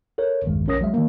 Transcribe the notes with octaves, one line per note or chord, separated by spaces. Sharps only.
A4 A#4 C#5
B1 E2 G2 D#3 G#3
A#1 C#4 A#4 C#5 D#6 A#6
F#3 G#3 E5
D#3 A#3